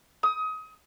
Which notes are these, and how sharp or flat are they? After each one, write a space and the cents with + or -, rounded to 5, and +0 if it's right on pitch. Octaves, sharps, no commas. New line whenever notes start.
D#6 +25